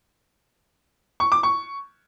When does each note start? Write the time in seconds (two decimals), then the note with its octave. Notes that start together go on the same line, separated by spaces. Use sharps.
1.20 C#6
1.32 D6
1.43 C#6